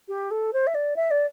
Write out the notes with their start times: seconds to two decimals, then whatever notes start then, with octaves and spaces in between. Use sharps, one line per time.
0.08 G4
0.31 A4
0.53 C5
0.67 E5
0.74 D5
0.96 E5
1.11 D5